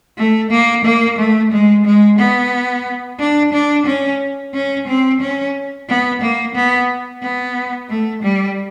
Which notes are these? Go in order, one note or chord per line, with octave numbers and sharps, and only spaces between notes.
A3
A#3
A#3
A3
G#3
G#3
B3
D4
D4
C#4
C#4
C4
C#4
B3
A#3
B3
B3
A3
G3